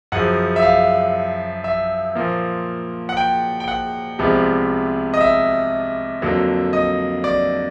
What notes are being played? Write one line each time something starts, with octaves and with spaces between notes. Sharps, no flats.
F#2 C#3 F3 F#5
E5
F5
E5
A#2 F3 A#3
F#5
G5
G5
F#5
C2 C3 F3 G#3 B3
D#5
E5
F2 D3 F#3 A#3
D#5
D5